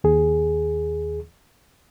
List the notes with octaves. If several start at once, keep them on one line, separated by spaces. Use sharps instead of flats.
D#2 G#4